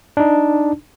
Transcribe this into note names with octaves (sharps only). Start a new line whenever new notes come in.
D4 D#4